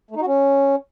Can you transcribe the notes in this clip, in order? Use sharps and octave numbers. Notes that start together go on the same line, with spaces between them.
A3
D#4
F#4
C#4